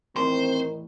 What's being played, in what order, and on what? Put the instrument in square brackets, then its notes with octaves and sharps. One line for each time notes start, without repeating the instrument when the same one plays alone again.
[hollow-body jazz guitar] E2 A2 C6 [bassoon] D#3 [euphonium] C4 [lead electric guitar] C5